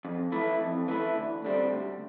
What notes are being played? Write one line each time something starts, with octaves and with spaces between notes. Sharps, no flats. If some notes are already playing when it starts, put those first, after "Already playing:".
F2
E3 A3 E4
F2
E3 A3 E4
D2
D3 G3 C4
D2